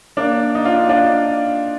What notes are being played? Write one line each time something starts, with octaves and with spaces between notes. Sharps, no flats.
A#3 D4
D#4
D4 F4
D4 F4